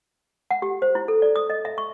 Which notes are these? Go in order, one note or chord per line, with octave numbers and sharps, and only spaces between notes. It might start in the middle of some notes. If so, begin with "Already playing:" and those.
F#5
G4
C5
E4
A4
D5
D#6
D#5
E5
C#6